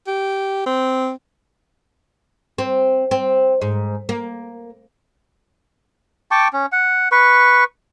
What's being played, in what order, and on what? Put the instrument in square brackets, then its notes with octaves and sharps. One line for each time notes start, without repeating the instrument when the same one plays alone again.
[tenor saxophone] G4
C4
[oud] C4
C4
G#2
A#3
[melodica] G5 A5 C#6 D6
C#4
F#5
B4 C#6